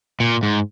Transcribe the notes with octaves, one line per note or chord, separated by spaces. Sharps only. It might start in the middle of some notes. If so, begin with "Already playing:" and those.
A#2
G#2